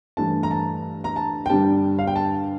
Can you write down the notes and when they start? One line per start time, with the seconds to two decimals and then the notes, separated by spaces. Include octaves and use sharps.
0.17 G2 E3 A3 A5
0.43 A#5
0.51 A5
1.04 A#5
1.16 A5
1.46 G5
1.50 G2 D3 G3 A5
1.99 F5
2.07 G5
2.16 A5